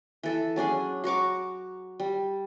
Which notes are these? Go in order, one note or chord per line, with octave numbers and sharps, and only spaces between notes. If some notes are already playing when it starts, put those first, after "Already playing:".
E3 A4
F#3 C#4 D4 G#4
F#4 A#5 C#6 D6
G3